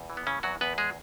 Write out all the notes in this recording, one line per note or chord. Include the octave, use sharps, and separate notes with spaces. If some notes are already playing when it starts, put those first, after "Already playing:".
Already playing: E2
E3
B3
C#3 E3 C#4
E2 F#3 F#4
E2 B3 B4
G#3 G#4